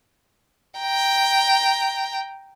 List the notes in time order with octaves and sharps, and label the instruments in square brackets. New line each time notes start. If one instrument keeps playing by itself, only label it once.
[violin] G5 A#5